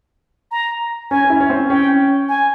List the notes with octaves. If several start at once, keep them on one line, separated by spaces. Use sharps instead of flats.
A#5
C#4 G#5
C#4
E4
C#4
C4
C#4 G5
G#5